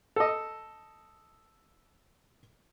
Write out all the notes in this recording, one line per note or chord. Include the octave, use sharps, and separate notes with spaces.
A4 D#5